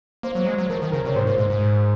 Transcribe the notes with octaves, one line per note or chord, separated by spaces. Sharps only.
A#3 C5
F#3
G#3
F#3
F3 A#4
D#3
C#3 A#4
C3 C#5
G#2 C5
A#2
G#2
G#2